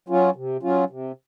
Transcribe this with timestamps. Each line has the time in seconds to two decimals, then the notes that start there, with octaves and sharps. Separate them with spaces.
0.08 F#3 C#4 F4
0.36 C3
0.63 F#3 C#4 F4
0.90 C3